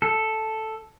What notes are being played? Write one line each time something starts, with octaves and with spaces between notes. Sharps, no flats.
A4